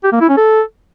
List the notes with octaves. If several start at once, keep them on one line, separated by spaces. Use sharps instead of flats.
G4
A#3
E4
C#4
A4